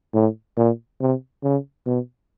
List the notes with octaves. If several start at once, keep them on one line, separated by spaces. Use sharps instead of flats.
A2
A#2
C3
C#3
B2